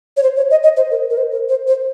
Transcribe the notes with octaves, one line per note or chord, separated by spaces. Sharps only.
C#5
C5
C#5
D#5
D#5
C5
A#4
A#4
C5
A#4
C5
C5